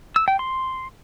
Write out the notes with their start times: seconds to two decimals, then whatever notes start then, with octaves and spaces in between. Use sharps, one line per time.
0.16 E6
0.28 G5
0.39 C6